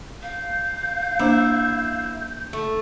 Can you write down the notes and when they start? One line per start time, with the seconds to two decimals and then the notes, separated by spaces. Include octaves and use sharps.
0.23 F5 G6
1.19 A#3 D4 E4 C5
2.53 A3 D#4